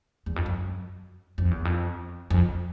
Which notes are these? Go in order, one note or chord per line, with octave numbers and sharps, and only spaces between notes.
E2
F2
F#2
F2
E2
F2
F2